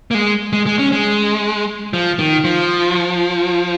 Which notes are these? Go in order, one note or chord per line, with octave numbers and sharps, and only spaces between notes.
A#3
G#3
G#3
G#3
C#4
G#3
F3
D#3
F3